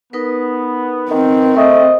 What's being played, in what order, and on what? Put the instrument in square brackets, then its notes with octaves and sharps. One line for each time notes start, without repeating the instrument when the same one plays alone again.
[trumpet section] B3 [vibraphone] D#4 A#4 B4
[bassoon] D#3 [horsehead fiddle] C4
[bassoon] A3 [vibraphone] A#4 C5 [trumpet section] D#5